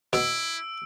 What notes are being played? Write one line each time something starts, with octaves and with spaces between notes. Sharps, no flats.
B2 E4 E6 D7